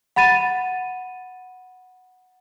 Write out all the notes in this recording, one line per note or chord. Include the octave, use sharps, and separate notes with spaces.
F#5 B5 A6 D#7